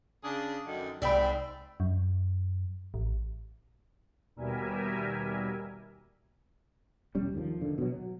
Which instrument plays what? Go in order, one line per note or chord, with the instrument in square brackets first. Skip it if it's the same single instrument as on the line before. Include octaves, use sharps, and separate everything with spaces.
[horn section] C#3 D4 G#4
F#2 D3 D#3
[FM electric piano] C2 B5 [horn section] G#2 C4 E5 [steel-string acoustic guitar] D5 G5
[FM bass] F#2
A1
[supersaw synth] D#2 B2 G3 A#4 E5 G#5
[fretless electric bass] E1 G3 C#4
D#2 D#3 F3
D3 D#3
B2 F#3
F#3